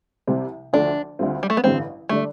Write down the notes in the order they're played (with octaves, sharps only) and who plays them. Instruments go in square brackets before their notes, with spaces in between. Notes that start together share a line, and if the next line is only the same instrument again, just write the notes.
[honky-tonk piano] C2 C3 G3 C4 G4
[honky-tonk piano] D2 D3 F3 A3 [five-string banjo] D4
[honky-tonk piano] D2 D3 G3 C4 F4
[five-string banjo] G3
A3
B3
[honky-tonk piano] A1 G2 D3 G3 [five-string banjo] C4
[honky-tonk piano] D3 G3 D4 [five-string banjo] A3